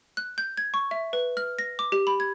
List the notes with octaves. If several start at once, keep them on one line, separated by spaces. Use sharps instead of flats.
F#6
G6
G#6
C#6
E5
B4
F6
A#6
D6
G4
B5
G#6